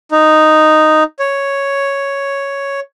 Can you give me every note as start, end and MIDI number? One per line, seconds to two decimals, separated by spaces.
0.12 1.03 63
1.19 2.80 73